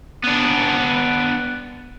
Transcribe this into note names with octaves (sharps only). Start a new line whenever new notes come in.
B3 D4